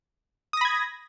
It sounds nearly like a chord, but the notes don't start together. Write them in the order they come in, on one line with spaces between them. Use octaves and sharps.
D#6 A#6 B5 G#6